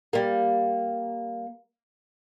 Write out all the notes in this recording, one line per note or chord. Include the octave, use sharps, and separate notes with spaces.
G3 A#3